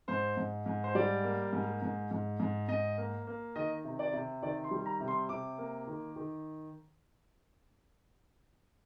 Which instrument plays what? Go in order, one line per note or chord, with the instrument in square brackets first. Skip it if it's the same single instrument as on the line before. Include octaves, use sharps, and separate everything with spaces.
[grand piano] G#2 C5
G#2
G#2
C5
G3 D5
A#3
G#2
G#2
G#2
G#2
G#2 D#5
A#3
A#3
D#3 D#5
C3
D5
C3
D#3 D5
C6
G3
A#5
C3
C6
C3 D6
A#3
D#3
D#3